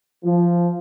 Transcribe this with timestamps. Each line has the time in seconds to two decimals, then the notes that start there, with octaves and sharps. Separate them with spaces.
0.25 F3